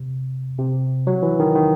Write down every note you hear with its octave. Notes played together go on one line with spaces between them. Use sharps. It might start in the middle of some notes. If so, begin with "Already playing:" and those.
Already playing: C3
C3
F#3
E3
D#3
D#3